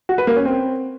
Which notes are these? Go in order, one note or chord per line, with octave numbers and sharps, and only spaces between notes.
F#4
B4
A#3
C#4
C4